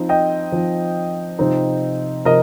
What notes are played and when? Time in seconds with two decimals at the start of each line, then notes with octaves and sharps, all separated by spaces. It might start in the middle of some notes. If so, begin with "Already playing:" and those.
Already playing: F3 C4 D#4
0.09 D#5 G5
0.52 F3 C4 D#4
1.39 C3 F3 C4 D#4
2.25 C3 F3 A#4 D#5